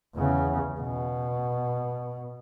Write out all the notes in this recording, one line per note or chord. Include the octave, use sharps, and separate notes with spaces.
E2 C#3
B2